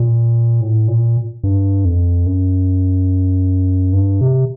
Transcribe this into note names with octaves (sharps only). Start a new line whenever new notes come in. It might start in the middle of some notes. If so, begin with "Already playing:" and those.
Already playing: A#2
A2
A#2
G2
F2
F#2
G2
C3